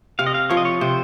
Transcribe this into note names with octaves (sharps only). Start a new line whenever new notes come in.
C3 F5
D#5
F5
F3 C#5
D#5
C#5
C3 C5